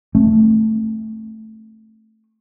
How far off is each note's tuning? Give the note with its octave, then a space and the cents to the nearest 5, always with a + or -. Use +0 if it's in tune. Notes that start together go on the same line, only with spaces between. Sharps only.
A3 +0 C4 +35